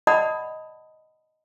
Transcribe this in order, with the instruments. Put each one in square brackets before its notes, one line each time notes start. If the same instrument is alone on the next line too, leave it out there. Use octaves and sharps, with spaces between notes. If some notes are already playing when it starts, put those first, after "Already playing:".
[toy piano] D5 D#5 F#5 A5 B5 D#6